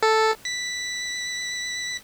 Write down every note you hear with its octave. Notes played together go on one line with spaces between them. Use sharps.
A4
B6